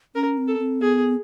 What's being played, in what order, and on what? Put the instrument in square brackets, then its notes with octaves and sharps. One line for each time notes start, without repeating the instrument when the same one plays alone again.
[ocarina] C#4 [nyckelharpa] A#4
[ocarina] C4
[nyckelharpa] A4
[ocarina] C4
[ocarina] B3 [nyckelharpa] G#4